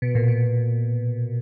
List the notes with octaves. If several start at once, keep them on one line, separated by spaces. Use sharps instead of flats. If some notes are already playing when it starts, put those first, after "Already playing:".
B2
A#2
B2